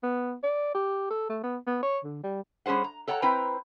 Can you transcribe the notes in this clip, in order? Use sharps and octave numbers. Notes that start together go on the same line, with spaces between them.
B3
D5
G4
A4
A3
B3
B3
C#5
D3
G3
G3 C#4 G#4 C5 F#5
A#5
A4 C#5 F#5 G5 A#5
C4 E4 B4 C5 G5 A#5